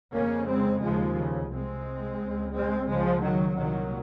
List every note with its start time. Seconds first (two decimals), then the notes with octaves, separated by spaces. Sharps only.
0.13 F2 C#3 A#3 C#4
0.47 G#3 C4
0.81 D#2 C#3 F3 G#3
1.16 C#3
1.49 C2 C3 G#3 C4
2.19 C#2 C#3
2.53 G#3 C4
2.87 C#2 C#3 F3 G#3
3.21 D#3 F#3
3.56 C2 A#2 D#3 F#3